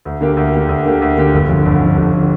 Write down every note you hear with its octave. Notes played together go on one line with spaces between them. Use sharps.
D2
D3 A#3 G4
D2
D3 A#3 G4
D2
D3 A#3 G4
D2
D3 A#3 G4
G1
F2 D3
G1
F2 D3
G1
D3